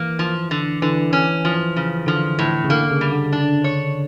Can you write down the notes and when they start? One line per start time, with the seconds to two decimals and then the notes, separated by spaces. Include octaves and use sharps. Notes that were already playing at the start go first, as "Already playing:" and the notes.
Already playing: E3 A#3
0.19 F3
0.51 D3
0.82 D3 E3
1.13 C#4
1.45 F3
1.76 C#3
2.07 D3 F3
2.39 A2
2.64 C#3
2.70 D3 A#3
2.91 C#3
3.01 G3
3.12 D3
3.32 D4
3.64 C#5